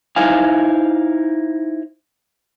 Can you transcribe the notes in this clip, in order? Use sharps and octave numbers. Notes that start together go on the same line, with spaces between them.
D#4 E4 C5 F5 G#5